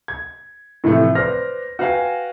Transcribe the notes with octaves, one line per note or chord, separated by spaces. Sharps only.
G#6
A2 C3 E3 F3 A3
B4 C5 D5 F6 A#6
F#4 B4 F5 G5 G#5